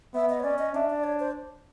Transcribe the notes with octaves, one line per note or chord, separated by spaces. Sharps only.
B3 E5
D#5
C#5
C#4 D5
D#5
D4 E5
D5
C#5
C5